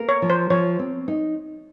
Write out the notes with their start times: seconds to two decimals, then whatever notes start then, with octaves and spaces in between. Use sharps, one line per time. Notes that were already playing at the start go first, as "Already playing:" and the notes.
Already playing: A#3 A#4
0.09 C#5
0.22 F3
0.30 C5
0.50 F3 C#5
0.79 C4
1.08 D#4